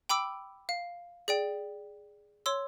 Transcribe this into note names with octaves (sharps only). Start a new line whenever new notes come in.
G5 B5 D6 E6 D7
F5
G#4 D5 G5
C#5 C6 E6